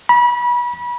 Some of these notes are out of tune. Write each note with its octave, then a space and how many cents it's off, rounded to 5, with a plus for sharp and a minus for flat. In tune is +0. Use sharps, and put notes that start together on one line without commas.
B5 -30